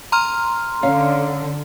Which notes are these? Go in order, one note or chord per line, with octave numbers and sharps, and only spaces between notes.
A#5 C6 F6
D3 C#4 C#5 F5